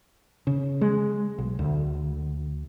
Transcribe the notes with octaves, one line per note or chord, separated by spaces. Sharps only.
C#3
G#3
B1
D2